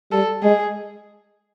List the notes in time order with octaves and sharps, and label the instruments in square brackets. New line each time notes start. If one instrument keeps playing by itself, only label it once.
[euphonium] G3 [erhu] A4
[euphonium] G#3 [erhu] G#4